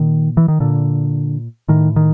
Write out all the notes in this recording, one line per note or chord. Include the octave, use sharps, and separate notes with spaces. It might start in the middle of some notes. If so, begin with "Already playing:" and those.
Already playing: A#2 D#3
E3
D#3
A#2 D3
A2 D#3
D#3